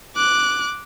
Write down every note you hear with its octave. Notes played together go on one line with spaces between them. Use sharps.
D6 F#6